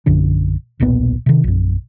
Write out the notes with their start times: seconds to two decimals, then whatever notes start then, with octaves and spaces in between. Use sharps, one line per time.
0.06 A#1 F#2 D3 D4
0.80 D#1 B1 A#2 B3
1.26 C3 D#3
1.44 A#1 F#2